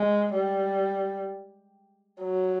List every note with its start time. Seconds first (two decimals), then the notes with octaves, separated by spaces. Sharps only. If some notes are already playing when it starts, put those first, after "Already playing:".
Already playing: G#3
0.34 G3
2.22 F#3